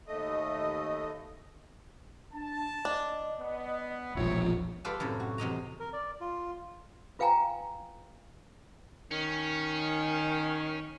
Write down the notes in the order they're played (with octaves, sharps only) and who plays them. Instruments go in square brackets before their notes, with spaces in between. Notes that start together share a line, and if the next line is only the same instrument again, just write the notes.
[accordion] D#2 A3 D#5
[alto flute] D4 [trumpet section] A5
[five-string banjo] D4 [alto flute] D#5
[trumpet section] B3
[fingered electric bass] E1 A#1 F3 [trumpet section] C4 C#5 E5 [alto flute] F4
[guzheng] F4 G4 A4 B4 C5 D5
F#2 A2 C3
F#4
E2 C3 D#5 A#5
[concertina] A#4
D5
F4
[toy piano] F4 B4 F5 G5 G#5 A#5
[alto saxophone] D#3 [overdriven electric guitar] C#4